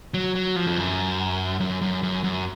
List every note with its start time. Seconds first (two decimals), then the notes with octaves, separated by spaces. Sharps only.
0.14 F#3
0.35 F#3
0.56 F3
0.67 F2
0.77 F#2
1.60 F#2
1.82 F#2
2.03 F#2
2.24 F#2